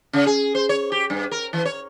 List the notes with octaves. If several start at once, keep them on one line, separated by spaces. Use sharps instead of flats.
C#3
G#4
C5
C#5
G4
G2
A#4
E3
C#5